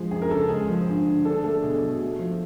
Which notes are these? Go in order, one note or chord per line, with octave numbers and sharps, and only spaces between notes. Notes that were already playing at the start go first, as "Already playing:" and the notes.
Already playing: F3 G#3 G#4
F#2 G#4
A#4
C#3 A4
G#3 G#4
F3
G2
D3
D4 A4
A3 A4
B2 G#4
F#3
A3
F3